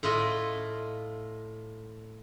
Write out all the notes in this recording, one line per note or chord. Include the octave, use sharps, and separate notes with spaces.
A2 E4 F4 D#5